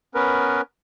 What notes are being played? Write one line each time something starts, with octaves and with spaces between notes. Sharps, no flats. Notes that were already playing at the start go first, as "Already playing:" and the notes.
B3 C#4 A#4 B4